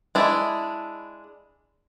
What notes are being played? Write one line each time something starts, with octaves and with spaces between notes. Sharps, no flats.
G#3 D4 E4